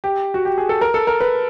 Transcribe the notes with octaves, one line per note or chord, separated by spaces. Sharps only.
G4
F#4
G4
G#4
A4
A#4
A4
A#4
B4